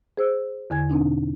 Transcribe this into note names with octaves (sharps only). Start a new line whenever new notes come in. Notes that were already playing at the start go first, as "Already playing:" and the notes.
G#4 C5 E6
E2 D3 G#5 G#6
B2 C4 D4 D#4